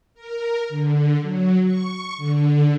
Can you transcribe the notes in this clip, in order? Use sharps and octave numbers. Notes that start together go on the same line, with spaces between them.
A#4
D3
F#3
C#6
D3